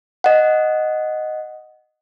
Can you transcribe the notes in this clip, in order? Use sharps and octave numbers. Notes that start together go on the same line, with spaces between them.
D#5 F#5